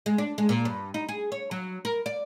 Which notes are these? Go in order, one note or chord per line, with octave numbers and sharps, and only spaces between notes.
G#3
D4
G#3
A#2
G2
D#4
G#4
C#5
F#3
A#4
D5